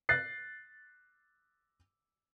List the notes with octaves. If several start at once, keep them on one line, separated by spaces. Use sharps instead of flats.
F#6 A6 C7